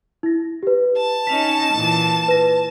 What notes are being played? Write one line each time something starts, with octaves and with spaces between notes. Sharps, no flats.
E4 A#6
G4 B4
A5
C#4 D#4 B6 F7
A#2 E3
B4 A#6